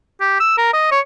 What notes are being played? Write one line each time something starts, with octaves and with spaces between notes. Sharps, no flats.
G4
E6
A#4
D#5
C#5